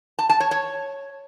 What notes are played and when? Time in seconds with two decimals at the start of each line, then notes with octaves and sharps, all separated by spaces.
0.19 A5
0.29 A5
0.40 C#5
0.51 C#5